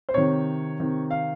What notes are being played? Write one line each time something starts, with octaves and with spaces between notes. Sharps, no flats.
C5
C3 D#3 C#5
C3 D#3
F5